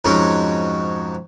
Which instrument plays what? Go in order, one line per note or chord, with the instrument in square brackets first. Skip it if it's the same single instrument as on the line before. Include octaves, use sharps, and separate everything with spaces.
[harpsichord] F2 G#2 F#3 G#3 C#4